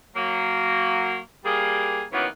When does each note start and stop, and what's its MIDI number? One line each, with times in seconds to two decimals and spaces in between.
0.16 1.18 54
0.16 1.18 58
1.45 2.03 55
1.45 2.03 58
1.45 2.03 68
2.13 2.26 51
2.13 2.26 52
2.13 2.26 54
2.13 2.26 58
2.13 2.26 59
2.13 2.26 61